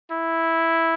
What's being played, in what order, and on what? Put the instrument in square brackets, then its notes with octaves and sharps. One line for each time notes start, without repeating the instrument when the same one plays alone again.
[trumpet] E4